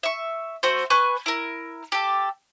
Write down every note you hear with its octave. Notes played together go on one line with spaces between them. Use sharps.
E5 C#6
A3 F#4 C5
B4 G#5 C#6 F#6
E4 A#4
G4 A4